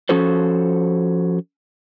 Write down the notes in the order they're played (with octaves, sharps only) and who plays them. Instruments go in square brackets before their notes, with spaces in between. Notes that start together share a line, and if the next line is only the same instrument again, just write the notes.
[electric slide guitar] F3 C#4 F#4 A4 C5